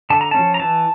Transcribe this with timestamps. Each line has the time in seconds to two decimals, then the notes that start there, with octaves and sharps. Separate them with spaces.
0.10 D3 A5
0.21 A#5
0.31 A#3 C#4 A5
0.39 F3
0.54 A#5
0.60 E3 A5